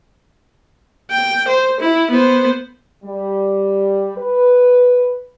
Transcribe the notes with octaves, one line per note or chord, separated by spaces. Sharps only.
G5
C5
E4
B3 C5
G3
B4